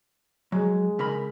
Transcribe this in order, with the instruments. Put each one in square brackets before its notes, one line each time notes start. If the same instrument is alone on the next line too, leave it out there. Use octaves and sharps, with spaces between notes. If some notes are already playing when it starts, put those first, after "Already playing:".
[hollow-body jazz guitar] F#3 [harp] G#3
[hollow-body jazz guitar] C#3 A#4 B5